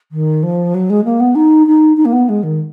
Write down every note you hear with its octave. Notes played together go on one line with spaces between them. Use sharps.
D#3
F3
F#3
G#3
A#3
B3
D#4
D#4
D#4
A#3
B3
G#3
D#3